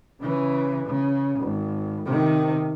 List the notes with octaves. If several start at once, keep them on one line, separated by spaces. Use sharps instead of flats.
C#3 E3
C#3
G#1
C3 D#3